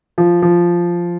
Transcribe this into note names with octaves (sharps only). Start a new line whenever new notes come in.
F3
F3